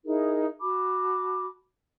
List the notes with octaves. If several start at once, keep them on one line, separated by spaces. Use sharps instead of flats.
D#4 E4 G#4 A#4
F#4 A5 B5 D6